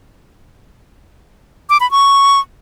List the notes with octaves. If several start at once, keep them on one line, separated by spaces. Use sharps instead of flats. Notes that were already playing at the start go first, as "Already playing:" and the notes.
D6
B5
C#6